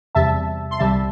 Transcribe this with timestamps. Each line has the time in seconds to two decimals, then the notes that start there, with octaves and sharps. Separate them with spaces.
0.15 E2 C3 G3 E5 A5
0.71 C6
0.79 C2 C3 G3 E5 A5